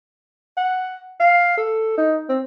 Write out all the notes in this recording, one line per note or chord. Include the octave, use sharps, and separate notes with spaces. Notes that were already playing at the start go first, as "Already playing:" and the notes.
F#5
F5
A4
D#4
C4